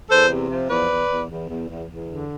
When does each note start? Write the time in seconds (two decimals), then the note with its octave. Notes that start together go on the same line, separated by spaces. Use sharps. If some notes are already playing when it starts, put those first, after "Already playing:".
0.09 E2 A4 C5
0.29 C3
0.49 F3
0.69 E2 B4 D5
0.89 E2
1.09 E2
1.29 E2
1.49 E2
1.68 E2
1.88 E2
2.08 D3